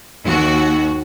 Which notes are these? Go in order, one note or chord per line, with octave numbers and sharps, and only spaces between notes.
D#2 F#4